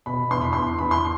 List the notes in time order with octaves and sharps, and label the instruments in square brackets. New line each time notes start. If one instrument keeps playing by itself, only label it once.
[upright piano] B2 B5
E2 C6
B5
E2 C6
E2 B5
C6